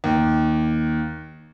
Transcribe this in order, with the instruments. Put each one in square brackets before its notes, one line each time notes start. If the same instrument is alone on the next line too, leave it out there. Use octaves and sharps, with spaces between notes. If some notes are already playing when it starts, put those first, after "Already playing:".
[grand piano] D#2